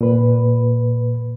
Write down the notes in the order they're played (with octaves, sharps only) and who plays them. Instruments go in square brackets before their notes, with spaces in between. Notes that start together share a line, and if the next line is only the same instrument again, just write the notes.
[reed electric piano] A#2 B4